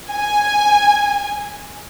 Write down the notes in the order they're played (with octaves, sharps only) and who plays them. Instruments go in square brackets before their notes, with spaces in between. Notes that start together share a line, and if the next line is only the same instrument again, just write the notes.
[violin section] G#5